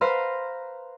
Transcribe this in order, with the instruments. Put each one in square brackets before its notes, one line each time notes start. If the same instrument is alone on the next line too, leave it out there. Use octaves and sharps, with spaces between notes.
[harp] B4 C5 F5 A#5 C6